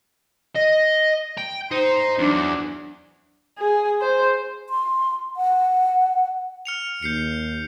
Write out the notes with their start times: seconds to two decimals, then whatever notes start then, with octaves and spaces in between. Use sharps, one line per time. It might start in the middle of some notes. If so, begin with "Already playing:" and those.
0.56 D#5
1.38 G5
1.71 D#4 C5
2.19 E2 F#3 D4
3.58 G#4
4.01 C5
4.70 C6
5.37 F#5
6.65 F6 C#7 F7
7.03 D#2 G6 C7 C#7